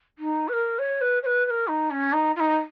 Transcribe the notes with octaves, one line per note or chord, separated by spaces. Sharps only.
D#4
B4
A#4
C#5
B4
C#5
B4
B4
A#4
D#4
C#4
D#4
F4
D#4